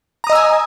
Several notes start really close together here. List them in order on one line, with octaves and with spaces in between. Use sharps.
A#5 D#6 D#5 E6 G#5